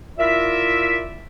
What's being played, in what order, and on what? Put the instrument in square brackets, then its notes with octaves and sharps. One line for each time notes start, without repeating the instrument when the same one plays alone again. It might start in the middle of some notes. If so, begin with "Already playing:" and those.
[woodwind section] E4 F4 A#4 D5 E5